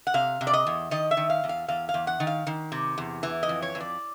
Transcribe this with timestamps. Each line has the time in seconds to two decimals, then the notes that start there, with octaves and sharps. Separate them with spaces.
0.07 F#5
0.14 C3 F5
0.41 C3
0.47 D5
0.53 D#5
0.67 E2
0.91 D#3 D#5
1.11 E5
1.17 D#3
1.30 F5
1.44 E2
1.49 F5
1.68 E2 F5
1.89 F5
1.94 E2
2.07 F#5
2.20 D#3
2.27 F5
2.47 D#3
2.72 C3
2.98 E2
3.23 E3
3.43 D#5
3.49 F2
3.62 C#5
3.75 F2
3.80 D5